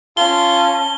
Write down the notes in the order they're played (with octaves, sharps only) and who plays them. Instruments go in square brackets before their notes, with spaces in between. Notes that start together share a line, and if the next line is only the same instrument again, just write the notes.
[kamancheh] C#4 A5 [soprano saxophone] F4 [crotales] G7